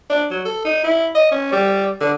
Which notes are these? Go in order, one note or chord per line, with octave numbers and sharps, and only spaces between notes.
D4
F#3
A4
D#4
E4
D#5
C#4
G3
D3